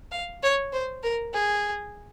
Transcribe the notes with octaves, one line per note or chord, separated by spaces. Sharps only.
F5
C#5
C5
A#4
G#4